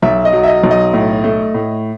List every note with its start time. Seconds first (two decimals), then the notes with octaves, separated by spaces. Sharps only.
0.02 B1 E5
0.25 D#5
0.33 F#3
0.43 E5
0.48 D#5
0.63 B1
0.71 D#5
0.93 A2
1.24 A3
1.54 A2